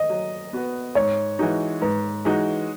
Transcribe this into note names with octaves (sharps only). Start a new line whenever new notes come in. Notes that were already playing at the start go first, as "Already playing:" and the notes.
Already playing: D#5
F#3
B3 F#4 B4
G#2 C#5
E3 G#3 D#4 F#4
G#2 B4
E3 G#3 D#4 F#4